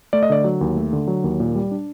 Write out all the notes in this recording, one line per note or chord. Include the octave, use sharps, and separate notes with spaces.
A3 D5
D#5
D3 D5
F#3
D#2
A3
D3
F#3
D#2
A#2
G3
D4